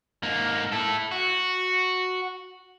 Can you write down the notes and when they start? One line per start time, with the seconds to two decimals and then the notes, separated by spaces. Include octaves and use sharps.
0.23 G#2 A#3
0.72 E4 A4
1.12 F#4